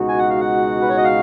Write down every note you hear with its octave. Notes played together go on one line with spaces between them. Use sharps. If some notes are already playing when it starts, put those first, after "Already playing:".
Already playing: C#2 B2 G#3 D#4 F#4
G#5
F#5
F5
F#5
B4
C#5
D#5
F5